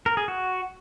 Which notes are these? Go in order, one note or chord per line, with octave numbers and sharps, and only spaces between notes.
A#4
G#4
F#4